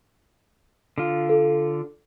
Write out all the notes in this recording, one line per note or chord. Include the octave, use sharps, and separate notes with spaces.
D3 F4
A4